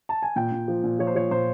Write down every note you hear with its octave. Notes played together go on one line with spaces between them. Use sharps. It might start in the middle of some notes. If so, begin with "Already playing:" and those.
A5
G#5
A#2 G5
A#2
F3
A#2
F3 C#5
C5
F3 C#5
A#2 C5